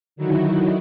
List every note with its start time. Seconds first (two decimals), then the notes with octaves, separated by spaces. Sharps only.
0.16 D3 D#3 F#3 D#4 E4 F#4